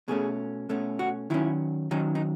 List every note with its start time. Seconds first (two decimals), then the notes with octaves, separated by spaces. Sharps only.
0.08 B2 A3 C#4 G#4
0.69 B2 A3 C#4
0.99 F#4
1.30 D#3 F#3 C#4 E4
1.91 D#3 F#3 C#4 D#4
2.15 D#4